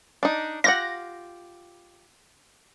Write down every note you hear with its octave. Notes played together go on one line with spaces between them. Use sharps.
D4 D#4
F4 G4 F#5 A#6